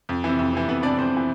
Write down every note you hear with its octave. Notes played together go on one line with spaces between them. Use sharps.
F2
C3 E3
F2
C3 E3
F2 B3 B4
C3 E3 D4 D5
F2 C4 C5
C3 E3